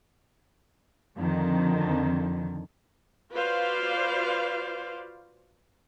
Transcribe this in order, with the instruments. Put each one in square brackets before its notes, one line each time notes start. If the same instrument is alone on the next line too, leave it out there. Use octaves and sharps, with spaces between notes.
[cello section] F2 D3 D#3
[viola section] F4 F#4 B4 C5 D5 F5